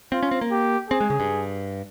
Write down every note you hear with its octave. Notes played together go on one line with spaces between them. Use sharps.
C4 F4
C#4
C4
A#3
G4
C4 G#4
G#3
C#3
G2